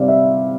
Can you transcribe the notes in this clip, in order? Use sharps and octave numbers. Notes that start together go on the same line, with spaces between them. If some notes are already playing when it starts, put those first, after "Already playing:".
Already playing: C3 G3 C4 D5 F5
E5